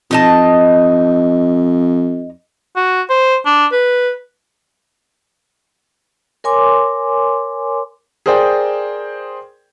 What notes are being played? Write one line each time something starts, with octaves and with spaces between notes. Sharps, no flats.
F2 D#4 D#5 A5
F#4
C5
D4
B4
A#4 C#5 G#5 C6 D6
G#4 A#4 C5 D5 G5